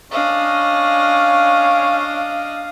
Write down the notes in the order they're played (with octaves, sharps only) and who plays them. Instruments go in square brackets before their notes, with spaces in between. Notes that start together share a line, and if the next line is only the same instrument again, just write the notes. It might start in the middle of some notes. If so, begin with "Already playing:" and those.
[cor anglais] C#4 [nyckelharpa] D4 D#5 [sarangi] F5